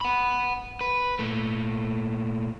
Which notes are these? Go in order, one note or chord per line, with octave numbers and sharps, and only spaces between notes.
F#5 B5
B4
A#2 A3